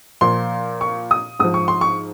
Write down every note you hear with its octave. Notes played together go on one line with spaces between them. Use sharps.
A#2 F3 C6
C#6
D#6
G#2 F3 D#6
C#6
C6
C#6